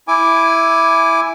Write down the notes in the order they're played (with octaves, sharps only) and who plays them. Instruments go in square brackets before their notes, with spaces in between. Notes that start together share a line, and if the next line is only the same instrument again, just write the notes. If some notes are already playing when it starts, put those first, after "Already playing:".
[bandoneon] E4 G#5 D6